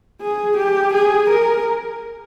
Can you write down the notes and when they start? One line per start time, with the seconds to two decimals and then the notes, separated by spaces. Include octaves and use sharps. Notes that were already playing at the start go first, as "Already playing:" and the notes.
0.22 G#4
0.57 G4
0.94 G#4
1.30 A#4